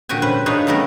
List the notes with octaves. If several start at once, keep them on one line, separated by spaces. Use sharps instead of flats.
A#2 D3 F#4 G4 G#5
C#4 B4 C5
D4 D#4 G#4 B4 C#5 F5
C#3 G3 A3 B3 A#4